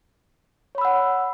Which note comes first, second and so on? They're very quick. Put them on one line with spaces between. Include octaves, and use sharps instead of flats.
C#5 B5 E6 F#5